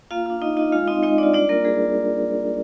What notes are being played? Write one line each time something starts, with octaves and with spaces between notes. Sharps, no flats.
A#3 F4 F5
D4 F4
A#3 D#4 D#5
D4 D#4 F4 D#5
G#3 F4 F5
C4 D#4 F4 D#5
G#3 D#4 D#5
C4 D4 F4 D5
G3 D4 D5
A#3 F4 A#4
G3 G#4